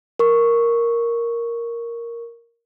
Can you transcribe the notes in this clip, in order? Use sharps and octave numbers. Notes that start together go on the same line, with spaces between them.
A#4 C#6